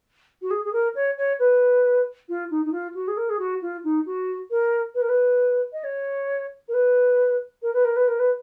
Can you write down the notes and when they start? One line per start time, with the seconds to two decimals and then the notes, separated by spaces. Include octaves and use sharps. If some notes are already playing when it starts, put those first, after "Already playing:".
0.42 F#4
0.50 G#4
0.64 G#4
0.73 A#4
0.95 C#5
1.17 C#5
1.39 B4
2.29 F4
2.50 D#4
2.65 D#4
2.72 F4
2.94 F#4
3.08 G#4
3.17 A#4
3.29 G#4
3.39 F#4
3.61 F4
3.84 D#4
4.06 F#4
4.50 A#4
4.94 B4
5.01 A#4
5.09 B4
5.73 D#5
5.84 C#5
6.68 A#4
6.73 B4
7.62 A#4
7.73 B4
7.84 A#4
7.96 B4
8.08 A#4
8.19 B4